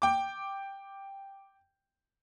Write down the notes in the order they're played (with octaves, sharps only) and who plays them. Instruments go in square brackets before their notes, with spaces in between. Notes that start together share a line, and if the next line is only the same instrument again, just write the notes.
[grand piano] G5 D6